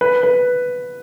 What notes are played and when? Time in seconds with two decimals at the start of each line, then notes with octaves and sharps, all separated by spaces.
0.01 B4
0.23 B4